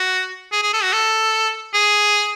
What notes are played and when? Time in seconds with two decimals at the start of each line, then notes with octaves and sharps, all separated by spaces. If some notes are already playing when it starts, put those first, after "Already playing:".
Already playing: F#4
0.52 G#4
0.62 G#4
0.73 A4
0.83 F#4
0.92 A4
1.74 G#4